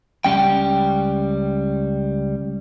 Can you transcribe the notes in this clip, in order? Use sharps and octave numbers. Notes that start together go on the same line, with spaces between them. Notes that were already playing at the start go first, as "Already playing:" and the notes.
C#2 G3 C#4 G5